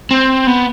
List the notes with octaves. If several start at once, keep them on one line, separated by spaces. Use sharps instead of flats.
C4
B3